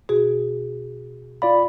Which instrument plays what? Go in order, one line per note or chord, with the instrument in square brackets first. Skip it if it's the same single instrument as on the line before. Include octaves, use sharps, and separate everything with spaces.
[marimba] B2 F#4 G#4
[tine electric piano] F4 D5 B5 [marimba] F5